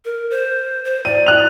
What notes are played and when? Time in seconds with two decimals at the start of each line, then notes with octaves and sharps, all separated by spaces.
0.05 A#4
0.30 C5
0.85 C5
1.05 D5 D#7
1.26 F#6 F7